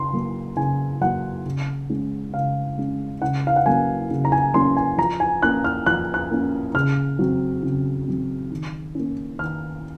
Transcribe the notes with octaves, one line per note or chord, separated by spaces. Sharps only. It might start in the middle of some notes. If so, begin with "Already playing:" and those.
Already playing: C#3 C6
F#3 A#3
C#3 G#5
F#3 A#3 F#5
C#3
G#3 C#4
C#3 F5
G#3 C#4
C#3 F#5
F5
F#5
F#3 A#3 C#4 G#5
C#3
A#5
G#5
F#3 A#3 C#4 C6
G#5
F3 A#5
G#5
A#3 C#4 F#6
F6
F3 F#6
F#6
A#3 C#4
C#3 F6
F#3 C4
C#3
F#3 C4
D#3
A#3 C#4
D#3 F6